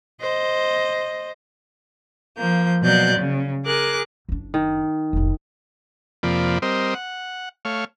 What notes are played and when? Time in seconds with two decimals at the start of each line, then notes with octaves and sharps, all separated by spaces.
0.21 C5 D#5
2.37 F3 A#3 G6
2.82 B2 F#3 A#3 D5 F#6 G6
3.17 C#3
3.64 G#4 A#4 D6 F#6
4.29 F#1 D4
4.54 D#3
5.13 F1 C2
6.23 F2 C3 F3 A#3 D5 B5
6.62 G3 C4 A#4 C5 D#5
6.94 F#5
7.65 A3 C#5 F5